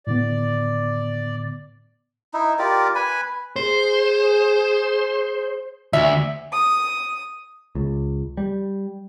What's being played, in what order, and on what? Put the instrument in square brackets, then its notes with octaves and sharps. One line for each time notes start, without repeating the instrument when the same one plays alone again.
[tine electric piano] A2 D3 B3 [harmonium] D5
[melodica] D#4 E4
F4 G4 A#4 D5
B4 G#5 B5
[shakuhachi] G#4 [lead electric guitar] C5
[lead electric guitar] D2 [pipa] E5
[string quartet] D#6
[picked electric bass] C#2
G3